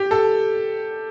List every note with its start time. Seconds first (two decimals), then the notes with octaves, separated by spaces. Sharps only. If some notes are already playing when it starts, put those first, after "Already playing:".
Already playing: G4
0.11 A4